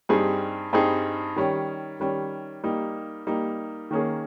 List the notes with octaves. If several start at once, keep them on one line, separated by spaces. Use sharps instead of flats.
G2 G3 C4 D#4 G#4
G2 G3 C4 D#4 G#4
D#3 G3 C#4
D#3 G3 C#4
G3 A#3 D#4
G3 A#3 D#4
D#3 A#3 C#4 G#4